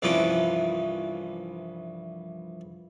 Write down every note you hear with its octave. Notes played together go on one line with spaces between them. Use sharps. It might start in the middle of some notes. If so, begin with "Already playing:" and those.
C2 G2 E3 F3 C#4 D6